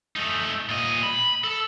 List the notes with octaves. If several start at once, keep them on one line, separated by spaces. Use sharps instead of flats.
A3 D#4
A#2 D#5
B5
A4